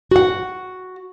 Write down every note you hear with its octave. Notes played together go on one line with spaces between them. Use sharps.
F#4 F#5